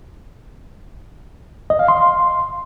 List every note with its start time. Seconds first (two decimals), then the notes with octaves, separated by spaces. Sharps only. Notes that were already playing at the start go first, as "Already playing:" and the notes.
1.70 D#5
1.79 F5
1.88 C6